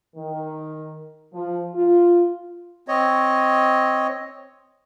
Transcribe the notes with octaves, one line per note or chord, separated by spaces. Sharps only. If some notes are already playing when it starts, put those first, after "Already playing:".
D#3
F3
F4
C4 C#5 D#5